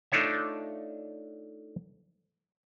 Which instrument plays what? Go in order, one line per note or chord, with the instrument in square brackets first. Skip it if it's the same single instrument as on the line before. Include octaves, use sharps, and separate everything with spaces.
[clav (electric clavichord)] A3 D4 D#4 F4 C#5 E5